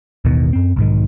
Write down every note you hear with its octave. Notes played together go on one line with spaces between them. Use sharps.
A1 D#2 B2 D#3
F#2 C4
B1 G#2 D#3